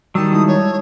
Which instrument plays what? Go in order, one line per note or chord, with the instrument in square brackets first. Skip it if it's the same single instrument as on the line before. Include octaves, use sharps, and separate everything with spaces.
[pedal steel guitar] D#3 F#3 [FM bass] G3 [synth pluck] A5 D#6 E6
[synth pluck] G#3 D#4 E4 [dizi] D#6
[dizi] C#5